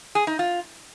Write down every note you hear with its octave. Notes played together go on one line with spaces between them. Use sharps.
G#4
D#4
F4